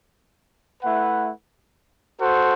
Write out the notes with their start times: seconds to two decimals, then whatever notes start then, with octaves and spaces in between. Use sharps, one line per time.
0.83 A3 E4 B4 F#5
2.21 F#4 A4 C5